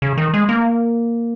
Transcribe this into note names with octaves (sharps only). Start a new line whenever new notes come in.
C#3
D#3
G#3
A#3